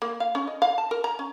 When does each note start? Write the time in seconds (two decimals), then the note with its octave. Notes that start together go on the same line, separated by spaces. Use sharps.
0.02 A#3
0.20 F5
0.35 C#4
0.47 D#5
0.62 F5
0.78 A5
0.91 A#4
1.04 A#5
1.19 C#4